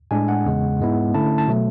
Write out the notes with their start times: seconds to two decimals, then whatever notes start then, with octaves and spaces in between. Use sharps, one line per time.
0.11 A2 G#3 D4 G#5
0.28 F#5
0.45 E2 C#3 G#3
0.80 G#2 G#3 B3 E4
1.14 D3 A3 C#4 E4 A5
1.38 A5
1.48 B2 F#3 A3